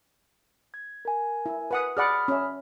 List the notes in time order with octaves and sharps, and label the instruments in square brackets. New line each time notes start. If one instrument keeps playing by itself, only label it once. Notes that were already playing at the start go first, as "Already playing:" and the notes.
[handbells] G#6
A#4 G#5
[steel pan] E4
B4 F#5 D#6
[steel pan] G#4 D5 F#5 [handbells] B5 D#6 F6
[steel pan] C#4 E5